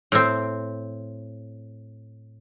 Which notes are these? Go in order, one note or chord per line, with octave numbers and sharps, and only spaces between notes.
A2 C4